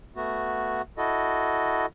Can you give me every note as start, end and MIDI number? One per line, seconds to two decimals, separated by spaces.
0.16 0.82 57
0.16 0.82 59
0.16 0.82 66
0.98 1.86 64
0.98 1.86 66
0.98 1.86 69
0.98 1.86 75